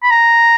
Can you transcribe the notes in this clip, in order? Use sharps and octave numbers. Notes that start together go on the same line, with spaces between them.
B5
A#5